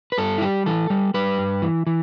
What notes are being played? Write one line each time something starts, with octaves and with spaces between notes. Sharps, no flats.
B4
G2 A4
E4
G3 G4
E3 A4
G3
G3 B4
G2
E3
E3